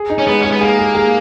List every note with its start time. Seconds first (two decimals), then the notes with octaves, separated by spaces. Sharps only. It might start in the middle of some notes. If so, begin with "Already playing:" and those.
Already playing: G#4
0.10 D#4
0.18 C#4
0.27 G#3 B3
0.42 G#3 C#4
0.52 B3
0.61 A#3 G#4
0.79 G#4
0.95 G#4